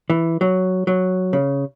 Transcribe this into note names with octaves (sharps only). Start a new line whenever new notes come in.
E3
F#3
F#3
C#3